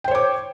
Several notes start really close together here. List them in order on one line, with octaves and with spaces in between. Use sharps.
G5 C5 C#5 D6